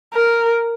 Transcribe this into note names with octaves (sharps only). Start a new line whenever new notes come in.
A#4